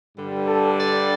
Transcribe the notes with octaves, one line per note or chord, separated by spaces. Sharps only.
G2 D3 G3
A4
D5